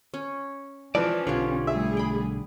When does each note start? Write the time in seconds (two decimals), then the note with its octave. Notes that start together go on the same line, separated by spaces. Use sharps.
0.14 C#4
0.95 E3 F3 C#4 D5
1.27 B1 D3 F4 G4 C#5
1.67 G3 A3 G#4 E5
1.97 G5 B5